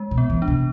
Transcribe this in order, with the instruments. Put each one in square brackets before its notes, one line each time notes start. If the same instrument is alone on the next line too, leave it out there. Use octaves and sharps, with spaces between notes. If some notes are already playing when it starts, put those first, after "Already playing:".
Already playing: [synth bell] G#3
[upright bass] B2
[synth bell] B3
[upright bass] E3
[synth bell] D4
[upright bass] C3